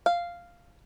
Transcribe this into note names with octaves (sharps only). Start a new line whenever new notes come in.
F5